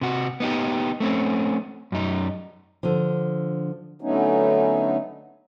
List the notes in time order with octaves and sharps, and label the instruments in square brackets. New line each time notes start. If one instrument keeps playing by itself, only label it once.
[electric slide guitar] C3 F#4
B3 D#4 G4
A3 C4 C#4
F#2 D#4
[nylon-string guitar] D3 F3
[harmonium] D3 F#3 A3 B3 C#4 D#4